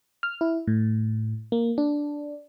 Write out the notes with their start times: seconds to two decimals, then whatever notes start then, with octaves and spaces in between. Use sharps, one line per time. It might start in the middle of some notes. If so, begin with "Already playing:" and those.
0.23 F6
0.41 E4
0.67 A2
1.52 A#3
1.78 D4